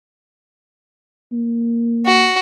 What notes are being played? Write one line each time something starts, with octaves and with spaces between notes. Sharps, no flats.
A#3
F#4